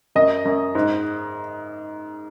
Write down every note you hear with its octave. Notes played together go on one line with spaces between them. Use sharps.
F#2 D#5
F#2
G#2